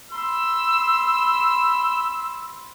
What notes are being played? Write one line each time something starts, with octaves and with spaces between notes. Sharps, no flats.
B5 C6 E6